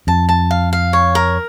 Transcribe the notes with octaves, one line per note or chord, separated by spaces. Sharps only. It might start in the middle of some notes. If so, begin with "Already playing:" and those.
F2 A5
A5
F5
F5
C#5
A#4